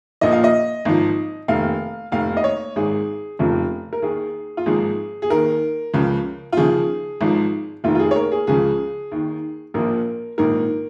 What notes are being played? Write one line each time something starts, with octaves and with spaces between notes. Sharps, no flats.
A#1 A#2 F3 D#5
F5
D#5
G#1 G#2 F3
F1 D#2 D#3 F5
F1 D#2 D#3 F5
D#5
C#5
G#1 G#2 D#3 G#4
F1 F2 C#3 F3
A#4
D#2 D#3 G#4
F4
G#1 G#2 F3 G#4
G#4
D#2 D#3 A#4
C#2 C#3 F3
F4
D#2 C#3 F3 G#4
G#1 G#2 F3
F1 D#2 D#3 F4
F4
G#4
C#5
A#4
G#4
C#2 C#3 F3 G#4
D#2 D#3
A#1 A#2 F3 A#4
A#1 G#2 D#3 A#4